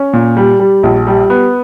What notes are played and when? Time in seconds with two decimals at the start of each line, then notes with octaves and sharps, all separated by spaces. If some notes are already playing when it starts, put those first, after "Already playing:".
Already playing: C#4
0.13 A#2
0.37 G3
0.60 G3
0.83 A#1
1.07 G3
1.30 B3